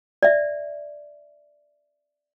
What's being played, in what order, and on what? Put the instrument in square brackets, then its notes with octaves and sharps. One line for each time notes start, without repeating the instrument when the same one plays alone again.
[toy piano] D5 E5